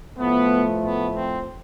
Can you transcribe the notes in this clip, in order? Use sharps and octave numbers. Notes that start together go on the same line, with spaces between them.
A2 F3 A3 B3
B3
C4